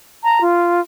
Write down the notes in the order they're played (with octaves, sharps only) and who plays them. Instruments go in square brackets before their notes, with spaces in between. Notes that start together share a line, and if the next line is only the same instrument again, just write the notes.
[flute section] A5 A#5
F4